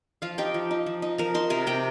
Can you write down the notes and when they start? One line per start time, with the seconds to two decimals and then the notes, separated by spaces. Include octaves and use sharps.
0.22 F3 F4 F5
0.38 D#4 G4 G5
0.54 F3
0.71 D#4
0.86 F3
1.02 D#4
1.18 F3 A#4 A#5
1.34 D#4 C5 C6
1.50 C3 A#4 A#5
1.67 C3 G4 G5